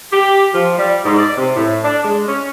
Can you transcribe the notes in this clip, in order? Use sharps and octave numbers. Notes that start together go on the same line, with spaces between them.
G4
F3
G3
G#2
D5
C3
A2
D4
G#3
C#4